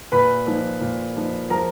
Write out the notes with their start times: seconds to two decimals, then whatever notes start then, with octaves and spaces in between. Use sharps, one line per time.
0.12 A#2 B4 B5
0.47 F3 A#3 D#4
0.81 A#2
1.16 F3 A#3 D#4
1.50 F3 A#4 A#5